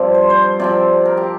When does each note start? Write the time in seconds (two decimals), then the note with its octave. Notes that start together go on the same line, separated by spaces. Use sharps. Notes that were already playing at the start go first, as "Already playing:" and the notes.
Already playing: G2 F3 C4 D5
0.14 C5
0.30 C5
0.60 C3 F3 C4 D5
1.05 A#4
1.17 G4